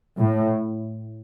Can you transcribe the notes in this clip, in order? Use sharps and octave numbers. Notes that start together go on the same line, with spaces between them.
A2